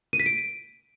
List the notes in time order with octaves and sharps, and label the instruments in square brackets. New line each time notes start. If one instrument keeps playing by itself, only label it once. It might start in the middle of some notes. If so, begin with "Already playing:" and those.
[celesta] D#7
B6
D7